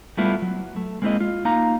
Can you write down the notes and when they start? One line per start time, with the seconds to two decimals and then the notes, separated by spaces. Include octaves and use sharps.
0.17 G3 A3 B3 E4 F4
0.42 F#3
0.76 A3
1.02 G#3 A#3 C4 E4 G#4 D#5
1.20 F4
1.45 A#3 D#4 F4 F5 A#5